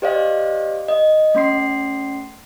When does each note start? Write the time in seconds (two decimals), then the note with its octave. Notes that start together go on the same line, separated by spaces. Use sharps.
0.02 G4 C5 D5 D#5 F5
0.88 D#5
1.35 A3 C#4 C6 C7